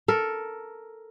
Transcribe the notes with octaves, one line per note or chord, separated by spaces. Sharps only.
A4 A#4